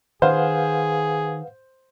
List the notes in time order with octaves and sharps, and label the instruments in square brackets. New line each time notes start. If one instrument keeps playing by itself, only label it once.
[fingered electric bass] D#3 [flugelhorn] G#4 [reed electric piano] B4 F5 F#5 [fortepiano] C5